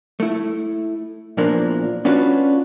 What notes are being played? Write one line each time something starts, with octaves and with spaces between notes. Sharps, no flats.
A3 E4
E2 A#2 E3 F3 D4 A#4
C#4 D4 F4 F#4 B4